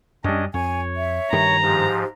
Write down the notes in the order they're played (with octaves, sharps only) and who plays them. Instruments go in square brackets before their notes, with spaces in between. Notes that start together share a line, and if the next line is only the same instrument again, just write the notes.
[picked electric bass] F#2 G3 [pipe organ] C#4 D4 D#5
[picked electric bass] F2 [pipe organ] C#5 [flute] G#5
[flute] E5
[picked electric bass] G2 D#3 G3 [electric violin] A#5
[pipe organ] G#2 F3 [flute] G4